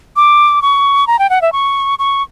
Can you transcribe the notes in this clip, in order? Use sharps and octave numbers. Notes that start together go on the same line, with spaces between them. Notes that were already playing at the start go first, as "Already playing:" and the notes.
D6
C#6
A#5
G5
F#5
E5
C#6
C#6